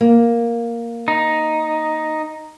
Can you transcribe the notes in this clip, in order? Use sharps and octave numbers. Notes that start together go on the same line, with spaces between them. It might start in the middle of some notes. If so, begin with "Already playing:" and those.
A#3
D#4